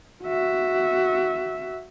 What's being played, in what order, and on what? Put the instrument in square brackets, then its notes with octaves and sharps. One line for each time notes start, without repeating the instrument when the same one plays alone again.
[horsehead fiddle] F#4 E5